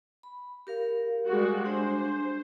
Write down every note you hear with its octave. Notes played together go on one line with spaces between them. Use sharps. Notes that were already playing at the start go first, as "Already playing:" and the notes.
B5
G4 A#4 F5
G3 G#3 F#4
G#3 D4 C5